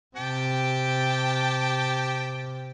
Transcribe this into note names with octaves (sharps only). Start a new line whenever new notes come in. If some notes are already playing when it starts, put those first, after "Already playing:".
C3 G4 G5 A5